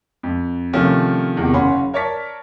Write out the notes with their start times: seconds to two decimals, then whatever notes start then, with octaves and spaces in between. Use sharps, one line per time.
0.23 F2
0.73 C3 D#3 F3 A3 C#4
1.37 E2 C3 D#3
1.53 F#1 C#3 C#4 F#5 B5 C6
1.94 A#4 C#5 D5 A5 C#6 B6